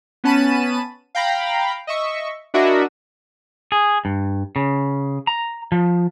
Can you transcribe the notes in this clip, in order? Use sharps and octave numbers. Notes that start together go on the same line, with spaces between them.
B3 C#4 A5 B5 D#7
F5 G5 A#5 B5
D#5 E5 C#6
D4 E4 F#4 A#4 D#5 E5
G#4
G2
C#3
A#5
F3